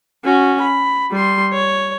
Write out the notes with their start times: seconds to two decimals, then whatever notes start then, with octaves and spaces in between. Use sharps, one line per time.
0.25 C#4 F#4
0.61 B5
1.11 G3 C6
1.53 C#5